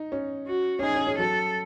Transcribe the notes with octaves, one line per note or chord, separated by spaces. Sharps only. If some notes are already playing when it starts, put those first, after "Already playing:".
Already playing: D#4
C#4
F#4
C#4
D#4 G#4
C#4
C#4
F#3 A4